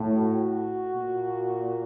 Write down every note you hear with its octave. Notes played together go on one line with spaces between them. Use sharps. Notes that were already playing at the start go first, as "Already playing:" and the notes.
Already playing: A2
F#4
A#2